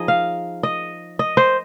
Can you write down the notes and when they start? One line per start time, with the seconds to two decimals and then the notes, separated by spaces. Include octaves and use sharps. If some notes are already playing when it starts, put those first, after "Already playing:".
Already playing: F3 D#4 G#4 D#5
0.08 F5
0.63 D#5
1.19 D#5
1.37 C5